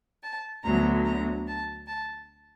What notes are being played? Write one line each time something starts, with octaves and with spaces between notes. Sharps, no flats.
A5
D2 D3 F#3 B3 A#5
A#5
A5
A5